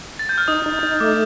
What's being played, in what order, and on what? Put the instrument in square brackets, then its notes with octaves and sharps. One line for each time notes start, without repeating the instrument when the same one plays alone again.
[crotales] A6
G6
F6
[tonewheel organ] D#4 [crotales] D#6
[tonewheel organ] D#4
D#4
[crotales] D#6
[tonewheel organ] A3 [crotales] D6